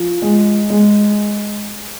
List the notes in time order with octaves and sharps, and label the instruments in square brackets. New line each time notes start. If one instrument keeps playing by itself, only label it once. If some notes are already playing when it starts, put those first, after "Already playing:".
Already playing: [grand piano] F3
G#3
G#3